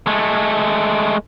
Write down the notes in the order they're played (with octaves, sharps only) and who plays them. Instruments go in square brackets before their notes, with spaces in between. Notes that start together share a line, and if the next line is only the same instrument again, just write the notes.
[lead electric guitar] G#3 A3